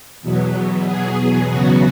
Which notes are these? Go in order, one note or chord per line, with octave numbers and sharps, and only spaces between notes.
E2 B2 F#3 B3
G#4
E2 C#3 F#3 B3 F#4